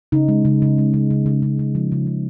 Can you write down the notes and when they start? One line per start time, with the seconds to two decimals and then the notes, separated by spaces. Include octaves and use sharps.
0.12 C#3 D#4
0.28 G#3
0.45 C#3
0.62 C#3
0.78 G#3
0.94 C#3
1.11 C#3
1.26 C#3
1.43 C#3
1.59 C#3
1.75 F3
1.92 C#3
2.07 C#3